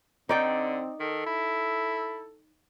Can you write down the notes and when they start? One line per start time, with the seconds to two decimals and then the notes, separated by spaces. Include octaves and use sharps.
0.29 D3 C4 D#4 D5 G5
1.00 D#3 A4
1.26 E4